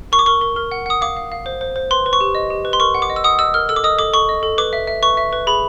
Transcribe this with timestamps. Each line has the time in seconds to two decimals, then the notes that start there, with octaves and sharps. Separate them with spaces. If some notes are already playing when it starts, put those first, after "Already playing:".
0.12 A#4 C#6
0.19 D6
0.26 A#4 C#6
0.41 A#4
0.56 A#4
0.71 F#5
0.86 F#5 D#6
1.01 F5 D6
1.17 F5
1.32 F5
1.46 C5
1.61 C5
1.76 C5
1.91 B4 C6
2.06 B4
2.13 C#6
2.21 G4
2.35 D#5
2.50 G4
2.65 B4
2.73 C6
2.80 A#4 C#6
2.95 F#5
3.02 D6
3.10 D#5
3.16 E6
3.24 F#5 D#6
3.39 D#5 E6
3.54 A#4 F6
3.69 A4 E6
3.76 D6
3.84 D#5 D#6
3.99 A4 D6
4.13 A4 C#6
4.29 D#5
4.43 A4
4.58 B4 D6
4.73 E5
4.87 E5
5.03 B4 C#6
5.17 E5
5.33 B4
5.47 G#4 B5